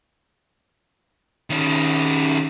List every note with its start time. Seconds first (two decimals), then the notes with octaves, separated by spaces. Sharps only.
1.50 D#3 C#4